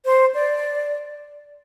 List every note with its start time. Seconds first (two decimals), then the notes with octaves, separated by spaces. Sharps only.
0.05 C5
0.34 D5